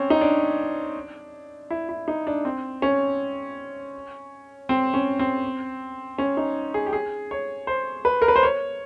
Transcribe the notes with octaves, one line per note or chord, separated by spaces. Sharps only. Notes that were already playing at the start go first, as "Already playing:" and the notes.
Already playing: C4 C#4
D#4
D4
E4
E4
D#4
D4
C4
C#4
C4
C#4
C4
C#4
D#4
G#4
G4
G#4
C#5
C5
B4
A#4
B4
C5
C#5